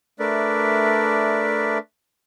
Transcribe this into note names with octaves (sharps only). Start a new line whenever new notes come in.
A3 D4 A#4 B4 D5 E5